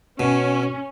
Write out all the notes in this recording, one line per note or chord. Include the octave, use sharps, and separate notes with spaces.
B2 C#4